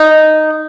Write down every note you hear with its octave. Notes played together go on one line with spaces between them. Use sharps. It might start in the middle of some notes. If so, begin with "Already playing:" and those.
Already playing: D#4